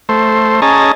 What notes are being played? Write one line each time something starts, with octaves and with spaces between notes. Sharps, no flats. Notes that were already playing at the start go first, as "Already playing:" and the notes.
A3 C5
C#4 G#4 D#5 A5 A#5